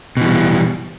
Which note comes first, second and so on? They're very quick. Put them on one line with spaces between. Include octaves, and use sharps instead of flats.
B2 E3 G3